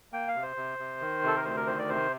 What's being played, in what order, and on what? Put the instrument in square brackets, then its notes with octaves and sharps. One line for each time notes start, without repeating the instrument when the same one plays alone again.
[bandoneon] A#3 G5
F5
C3
C5
C3
C3
D#3
C3 A4
A#4
D2 C5
A#4
D#3 C5
D5
C3 C5